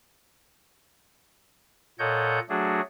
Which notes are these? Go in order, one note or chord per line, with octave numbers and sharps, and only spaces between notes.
A#2 A4 C#5 D#5 F#5 G6
F#3 A3 D4 F#4 G#4